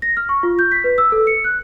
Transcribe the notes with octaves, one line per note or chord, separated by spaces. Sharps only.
A#6
F6
C#6
F4
G6
B6
B4
E6
A4
C#7
F#6